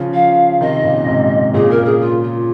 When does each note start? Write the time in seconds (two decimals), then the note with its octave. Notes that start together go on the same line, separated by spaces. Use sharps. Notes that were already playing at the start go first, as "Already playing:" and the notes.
Already playing: C#3 F3
0.14 F5
0.61 C3 D#3 D#5
0.84 A#2 C#3
1.07 G#2 C3
1.54 A#2 C#3 G#4
1.70 A#4
1.85 G#4
2.01 F4
2.23 F4